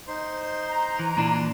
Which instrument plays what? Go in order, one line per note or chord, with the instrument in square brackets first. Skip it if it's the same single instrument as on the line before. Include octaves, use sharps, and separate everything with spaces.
[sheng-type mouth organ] D#4 C5 C6
[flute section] A#5
[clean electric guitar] E3
[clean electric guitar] A#2 E3 D4 [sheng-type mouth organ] C6